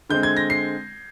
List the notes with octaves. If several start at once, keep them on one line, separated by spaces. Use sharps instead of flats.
D3 G#3 C4 G6
G#6
A#6
C7